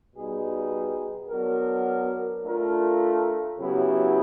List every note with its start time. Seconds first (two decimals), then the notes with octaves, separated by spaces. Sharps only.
0.15 B2 G3 B3 D#4 G#4
1.29 F#3 B3 D4 F#4 A#4
2.43 A3 D4 F4 A#4
3.58 C#3 F#3 B3 E4 G4